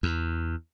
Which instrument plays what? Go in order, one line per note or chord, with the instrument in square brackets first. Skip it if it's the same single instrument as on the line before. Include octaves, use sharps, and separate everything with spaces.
[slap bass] E2